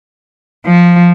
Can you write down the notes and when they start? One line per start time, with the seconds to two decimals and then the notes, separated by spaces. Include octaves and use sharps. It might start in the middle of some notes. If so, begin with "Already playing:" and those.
0.66 F3